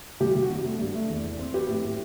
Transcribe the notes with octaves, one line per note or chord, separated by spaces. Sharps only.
C2 G4
G4
C2
F#4
C3
A3
G2
A3
E2
E2
C4
F#3 G4 B4
A2
A2